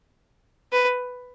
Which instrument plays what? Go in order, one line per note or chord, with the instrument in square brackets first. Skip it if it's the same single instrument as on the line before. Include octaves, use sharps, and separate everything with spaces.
[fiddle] B4